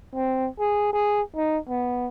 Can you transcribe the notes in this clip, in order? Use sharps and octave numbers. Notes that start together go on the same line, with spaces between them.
C4
G#4
G#4
D#4
B3